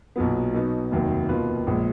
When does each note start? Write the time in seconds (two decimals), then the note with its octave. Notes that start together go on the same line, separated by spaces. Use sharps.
0.16 B1 A#2 F#3 B3
0.53 B2 F#3 B3 D#4
0.91 F1 D#2 D#3 F#3
1.29 B2 A#3 F4 B4
1.67 A#1 A#2 G#3